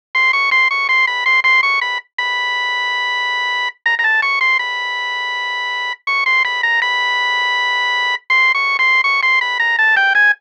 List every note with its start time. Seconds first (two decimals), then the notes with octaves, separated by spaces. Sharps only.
0.15 C6
0.33 C#6
0.51 C6
0.71 C#6
0.89 C6
1.07 B5
1.26 C6
1.44 C6
1.63 C#6
1.81 B5
2.18 B5
3.86 A#5
3.99 A#5
4.04 A5
4.22 C#6
4.41 C6
4.59 B5
6.07 C#6
6.26 C6
6.45 B5
6.63 A#5
6.82 B5
8.30 C6
8.55 C#6
8.79 C6
9.04 C#6
9.23 C6
9.41 B5
9.60 A#5
9.79 A5
9.97 G5
10.15 G#5